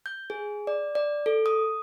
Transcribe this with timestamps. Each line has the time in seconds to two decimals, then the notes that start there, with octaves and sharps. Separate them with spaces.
0.06 G6
0.30 G#4
0.67 D5
0.95 D5
1.26 A4
1.46 D#6